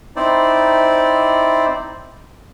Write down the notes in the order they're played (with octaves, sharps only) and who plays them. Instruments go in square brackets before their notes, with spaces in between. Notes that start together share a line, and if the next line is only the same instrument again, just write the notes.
[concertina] C4 D#4 E4 C5 D5